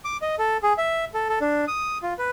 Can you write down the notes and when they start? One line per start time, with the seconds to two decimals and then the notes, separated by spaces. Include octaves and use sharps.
0.05 D6
0.22 D#5
0.39 A4
0.63 G#4
0.78 E5
1.14 A4
1.29 A4
1.41 D4
1.68 D#6
2.03 F4
2.18 B4